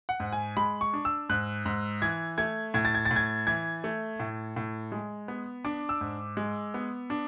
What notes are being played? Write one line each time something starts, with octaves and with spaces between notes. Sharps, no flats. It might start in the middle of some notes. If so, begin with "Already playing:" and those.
F#5
G#2
G#5
G#3 B5
C#6
D4
E6
G#2 F#6
G#2
E3 G#6
A3 G#6
A2 G#6
A6
G#6
A6
A2
G#6
E3 G#6
A3
A2
A2
G#3
B3
D4 D6
E6
G#2
G#3
B3
D4